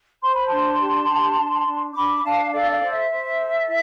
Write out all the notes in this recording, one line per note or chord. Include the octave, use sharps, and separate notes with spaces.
C5 C6
B5
D4 A5 C6
G4
D4
D4
D4
D4 B5 D6
D4 F5 A5
A4 D5 F5
D5 F5
C5
E5
C5
A4
E4